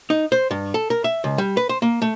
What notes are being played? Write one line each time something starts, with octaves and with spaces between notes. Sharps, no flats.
D#4
C5
G2
A4
A#4
E5
C#2
G3
B4
C5
A#3
A3